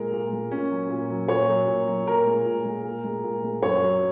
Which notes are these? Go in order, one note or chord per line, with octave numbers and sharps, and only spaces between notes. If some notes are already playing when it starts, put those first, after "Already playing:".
Already playing: A#2 G#3 A#4
A#2
G#3
A#2 C#4
F#3
A#2
F#3
A#2 C#5
F#3
A#2
F#3
A#2 A#4
G#3
A#2
G#3
A#2
G#3
A#2
G#3
F#2 C#5
F#3